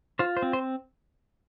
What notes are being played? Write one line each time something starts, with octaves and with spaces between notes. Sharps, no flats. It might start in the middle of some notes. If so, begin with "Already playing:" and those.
F4 C5
C5
C4
C5